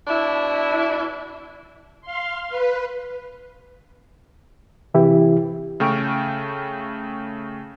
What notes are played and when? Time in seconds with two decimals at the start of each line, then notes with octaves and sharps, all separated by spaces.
0.07 B2 D4 E4
2.01 F5 C6
2.49 B4
4.94 C3 E3 E4 G4
5.80 C#3 A3 G5 C#6 F6 D7